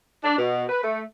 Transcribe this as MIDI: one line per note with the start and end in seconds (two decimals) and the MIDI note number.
0.23 0.36 62
0.38 0.64 47
0.70 0.81 71
0.83 1.00 57